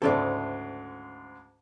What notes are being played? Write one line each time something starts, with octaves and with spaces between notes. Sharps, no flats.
D2 G#2 C#3 A4 D5 E5